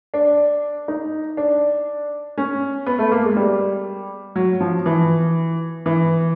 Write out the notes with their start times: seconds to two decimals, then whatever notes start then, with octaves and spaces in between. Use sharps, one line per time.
0.14 D4
0.88 D#4
1.37 D4
2.38 C#4
2.86 B3
2.99 A3
3.12 A#3
3.24 G#3
3.37 G3
4.36 F#3
4.61 F3
4.86 E3
5.86 E3